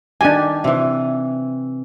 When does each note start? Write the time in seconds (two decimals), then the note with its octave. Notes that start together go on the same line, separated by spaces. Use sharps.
0.21 D#3 D4 G4 G#5
0.64 C3 E3